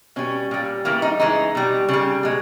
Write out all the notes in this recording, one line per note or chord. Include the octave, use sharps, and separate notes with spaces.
B2 G3 C#4
A#2 G3
C#3 E3 G3 A#3
D#4
C#3 E3 G#3 D#4
B2 G3
C#3 G3
B2 G#3